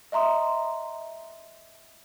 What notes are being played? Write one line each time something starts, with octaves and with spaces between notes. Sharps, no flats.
D#5 E5 A#5 C6 D#6